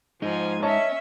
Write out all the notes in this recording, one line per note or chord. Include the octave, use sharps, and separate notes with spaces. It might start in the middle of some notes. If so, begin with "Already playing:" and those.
F3 G#3 D#4 G#5
C#4 C#5 D#5 E5 A5